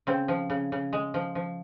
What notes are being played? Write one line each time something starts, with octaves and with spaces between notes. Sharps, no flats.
C#3 C4
F3
C#3
C#3
G#3
F3
F3